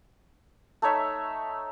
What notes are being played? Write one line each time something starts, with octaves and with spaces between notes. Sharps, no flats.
A3 D#4 C#5 E5